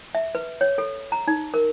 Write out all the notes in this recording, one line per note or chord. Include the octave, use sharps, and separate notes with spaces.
E5
B4
C#5
A4
A#5
D#4
A#4